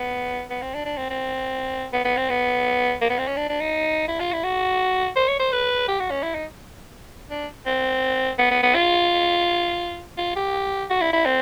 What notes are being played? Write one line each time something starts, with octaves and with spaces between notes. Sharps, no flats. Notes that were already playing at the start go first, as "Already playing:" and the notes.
Already playing: B3
B3
C4
D4
D4
C4
C4
B3
B3
C4
B3
A#3
B3
C4
C#4
D4
D4
D#4
E4
F4
E4
F#4
C5
C#5
C5
B4
G4
F#4
C#4
E4
D#4
D4
C4
B3
B3
B3
F4
F4
G4
F#4
E4
E4
C4